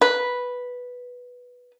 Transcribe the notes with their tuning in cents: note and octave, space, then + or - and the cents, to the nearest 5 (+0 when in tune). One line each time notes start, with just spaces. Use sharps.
B4 -5